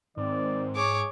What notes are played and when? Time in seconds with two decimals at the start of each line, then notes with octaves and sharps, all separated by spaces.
0.17 G#2 D#3 C4 D5
0.76 G#4 C#5 D6